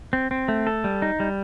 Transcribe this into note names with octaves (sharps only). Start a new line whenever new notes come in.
C4
C4
A3
A4
G3
D#4
G3